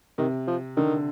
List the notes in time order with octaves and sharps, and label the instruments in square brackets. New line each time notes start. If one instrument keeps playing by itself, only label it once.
[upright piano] C3 [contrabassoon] D#3
[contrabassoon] F3
[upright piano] D3 [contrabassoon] D#3